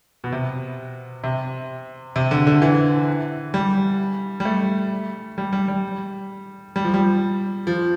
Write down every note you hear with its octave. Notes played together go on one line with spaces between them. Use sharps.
B2
C3
C3
C3
D3
D3
E3
G3
G3
A3
G3
G3
G3
G3
F3
G3
F3